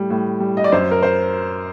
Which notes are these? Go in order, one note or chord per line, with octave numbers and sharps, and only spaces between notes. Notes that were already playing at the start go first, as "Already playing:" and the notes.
Already playing: A2 G3
A2
G3
D#5
D5
F#2 C5
A#4
C5